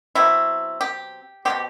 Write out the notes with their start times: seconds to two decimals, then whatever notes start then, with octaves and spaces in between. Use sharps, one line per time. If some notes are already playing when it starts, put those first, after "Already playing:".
0.15 B2 F#3 C4 E4
0.81 G4
1.45 B2 F#3 C4 G4